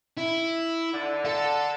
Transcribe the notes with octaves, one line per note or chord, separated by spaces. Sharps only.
E4
D3
A4 A5